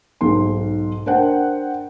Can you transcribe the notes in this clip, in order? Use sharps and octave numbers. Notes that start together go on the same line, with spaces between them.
B1 G#2 C6
D4 A#4 C5 F#5 G5